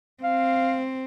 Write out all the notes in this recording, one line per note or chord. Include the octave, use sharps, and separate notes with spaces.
C4 F5